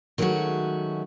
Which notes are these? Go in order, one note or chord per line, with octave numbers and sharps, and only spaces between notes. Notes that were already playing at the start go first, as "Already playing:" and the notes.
D#3 F#3 G#3 A3 C#4 F#4